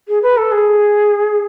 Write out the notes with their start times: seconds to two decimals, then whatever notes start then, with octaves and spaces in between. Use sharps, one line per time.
0.08 G#4
0.23 B4
0.37 A4
0.52 G#4